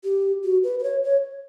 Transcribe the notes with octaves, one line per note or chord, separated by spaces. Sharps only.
G4
F#4
B4
B4
C#5
C#5